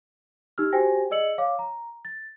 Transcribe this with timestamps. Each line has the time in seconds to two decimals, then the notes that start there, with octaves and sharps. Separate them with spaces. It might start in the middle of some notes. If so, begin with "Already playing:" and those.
0.58 D#4 G4 E6 F6
0.72 F#4 G4 C5 G5 G#5 A#6
1.10 G#4 D5 D#5 E6 C#7 F#7
1.38 C#5 F5 D6
1.59 A#5
2.05 A6